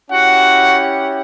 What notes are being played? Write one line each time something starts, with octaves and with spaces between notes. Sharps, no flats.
C#4 E4 F#4 G4 F#5